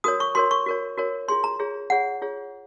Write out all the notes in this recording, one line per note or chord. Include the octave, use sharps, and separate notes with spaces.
F#4 A#4 C#5 D#6
C#6
F#4 A#4 C#5 C6
C#6
F#4 A#4 C#5
F#4 A#4 C#5
F4 G#4 C#5 C6
A#5
F4 G#4 C#5
F4 G#4 C#5 F#5
F4 G#4 C#5